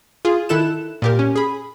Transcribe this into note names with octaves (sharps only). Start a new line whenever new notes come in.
F4 G#4
D#3 E4 A4 F#6 E7
A#2 G4 A#4
C#4
G#4 B5